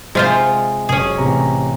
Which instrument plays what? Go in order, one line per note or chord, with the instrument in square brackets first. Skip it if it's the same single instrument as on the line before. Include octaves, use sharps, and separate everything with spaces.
[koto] C3 F4 C5 [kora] G#3 F5
[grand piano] F#1 [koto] C#4 G#4
[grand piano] A1 C3 A#5